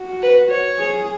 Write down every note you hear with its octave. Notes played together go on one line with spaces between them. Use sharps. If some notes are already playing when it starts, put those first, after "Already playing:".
Already playing: F#4
B4
C#5
G#4